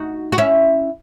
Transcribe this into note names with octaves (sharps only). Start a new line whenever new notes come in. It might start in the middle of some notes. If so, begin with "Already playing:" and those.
Already playing: D#4 F#4
F#4
C#4 E4